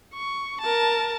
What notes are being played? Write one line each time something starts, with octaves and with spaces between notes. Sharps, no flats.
C#6
A#4 A5